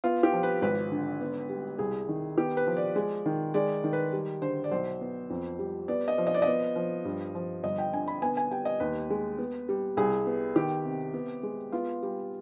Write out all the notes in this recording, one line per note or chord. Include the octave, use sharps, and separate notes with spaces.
B3 F4
G4
F3
B4
G#1 B4
D3
B3
G3
C2 G#4
D#3
B3 G4
B4
F3
D5
G#3
D#3
G#3 D5
D#3
B4
G3
D3 C5
D5
B1 C5
B3
F2
G3
B3 D5
D#5
F3
D#5
D5
D#5
B3
F3
G2
F3
G1 D#5
G5
D3 G#5
B5
B3 G#5
G#5
G3 G5
D#5
D#2 B4
G#3
B3
G3
C2 G#4
B3
D#3 G4
C3
B3
G#3
B3 F4
G3